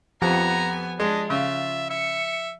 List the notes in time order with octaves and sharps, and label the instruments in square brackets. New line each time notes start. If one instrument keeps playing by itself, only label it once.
[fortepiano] F2 [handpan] F3 G4 F#5 [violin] B3 G#5 [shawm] A#5
[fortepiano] G#3 [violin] D4 [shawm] D#5
[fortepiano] C#3 [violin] F4 [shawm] E5
[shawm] E5 [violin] C#7